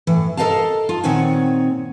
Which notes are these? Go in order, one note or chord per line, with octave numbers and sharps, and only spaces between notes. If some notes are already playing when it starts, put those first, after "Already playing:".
A2 E3
A4 A#4 C5 D#5 F5 A5
F4
A#2 D#3 C4 C#5 F#5 G#5